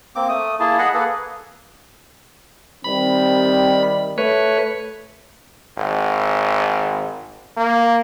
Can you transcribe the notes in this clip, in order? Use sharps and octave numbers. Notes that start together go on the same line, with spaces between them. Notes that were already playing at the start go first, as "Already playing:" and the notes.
A#3 C4 D6
A3 D#6
A#3 E4 G#4 A5
G#4 D#5 F#5 B5
A#3 G#4 A4 B4
C3 D#3 G3 C4 B5
A3 B4 C#5
G#1
A#3